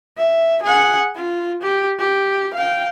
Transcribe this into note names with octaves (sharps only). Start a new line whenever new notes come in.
E5
G#4 F#5
F4
G4
G4
F5 G5